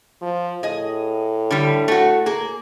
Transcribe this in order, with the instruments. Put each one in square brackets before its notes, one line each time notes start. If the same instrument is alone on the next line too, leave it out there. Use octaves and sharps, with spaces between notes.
[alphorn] F3
[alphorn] A2 [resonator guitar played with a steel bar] G#4 D#5
[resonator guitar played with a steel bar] D3 G3
A3 F#4
A#3 G#4